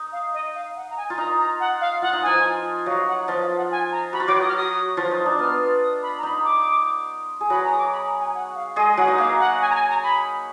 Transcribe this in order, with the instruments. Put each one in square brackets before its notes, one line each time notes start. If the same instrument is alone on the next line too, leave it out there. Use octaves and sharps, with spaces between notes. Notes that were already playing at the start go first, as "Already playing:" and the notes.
Already playing: [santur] D#4
[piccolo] F5
D#5
F5
F#5
A#5
G#5
[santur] F4
[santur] D#4 [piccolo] A#5
[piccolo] A#5
F#5
F5
[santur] F4 [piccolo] F#5
[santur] D#4
[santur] F3 F4 [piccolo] G#5
[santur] F#3 F#4 [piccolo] F5
[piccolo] F#5
[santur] F3 F4 [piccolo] D#5
[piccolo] F5
F#5
G#5
A#5
[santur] F#4 [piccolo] B5
[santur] F4
[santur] F#3 F#4 [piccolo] D6
[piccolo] D#6
F6
D#6
[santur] F3 F4
D#4
D4
[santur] B3 [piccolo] F6
[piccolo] D#6
B5
A#5
[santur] D#4 [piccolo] B5
[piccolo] D6
[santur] G#4
[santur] F#3 F#4 [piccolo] B5
[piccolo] A#5
D#6
D6
B5
A#5
G#5
F#5
F5
[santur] G#3 G#4 [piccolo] D#5
[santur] F#3 F#4 [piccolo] F#5
[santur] D#4
[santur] A#3 [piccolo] F5
[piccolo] F#5
G#5
A#5
G#5
A#5
B5